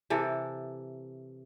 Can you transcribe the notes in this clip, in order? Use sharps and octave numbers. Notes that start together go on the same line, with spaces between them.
C3 E3 A4 A#4